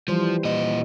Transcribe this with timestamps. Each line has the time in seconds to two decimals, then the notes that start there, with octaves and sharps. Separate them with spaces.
0.08 E3 F3 G3 C5
0.45 A#2 D#5